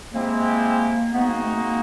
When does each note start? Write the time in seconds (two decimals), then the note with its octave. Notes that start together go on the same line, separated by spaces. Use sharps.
0.13 G#3 A#3 C4 E4 G4
1.13 G#3 B3 C4 D#4 F#4
1.27 A#3
1.42 A3
1.55 A#3